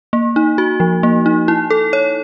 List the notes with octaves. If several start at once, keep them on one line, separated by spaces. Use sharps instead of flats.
A#3
D#4
F#4
F3
A#3
D#4
E4
A4
C#5